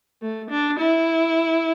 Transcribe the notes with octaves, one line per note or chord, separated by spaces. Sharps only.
A3
D4
E4